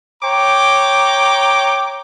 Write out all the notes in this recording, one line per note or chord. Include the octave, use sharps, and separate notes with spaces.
C#5 G5 A#5 D6